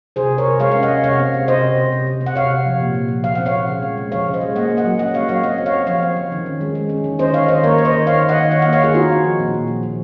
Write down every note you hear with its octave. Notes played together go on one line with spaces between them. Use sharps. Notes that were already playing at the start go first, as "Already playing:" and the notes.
C3 G#4 C5
C3
A#4 C#5
C3
G#3 C#5 F5
C#4 F5
D#5 F#5
C#4
C3 C#5 F5
C4
C4
C3 C5 D#5
C3
C3
C3
C3
C4
F#5
C3 C#5 F5
C3
F3
A#2
A#2
F3
F3 F5
C4 F#5
C#5 F5
F3
C#3
G#3
G#3
F3 C#5 F5
C#3
C5 D#5
G#3
A#3 D#5 F#5
A#3
D#5 F#5
F#3
C#4 D#5 F#5
A#3 C#5 F5
F#3 C#5 F5
C4 D#5 F#5
C4
C#5 F5
C4
F3 C#5 F5
C4
F3
D#3
C#4
G#3
G#3
C#4
D#3
C#4 C5 D#5
D#3 C#5 F5
D#3 C5 D#5
A#3 A#4 C#5
D#3 C#5
C5 D#5
D#3
D#3 C#5 F5
D#3
D#5 F#5
D#3
D#3 C#5 F5
D#5 F#5
A#3
C#5 F5
D#3 F4 G#4
C4 D#4 F#4
C4
F3
A#2
A#2
F3
F3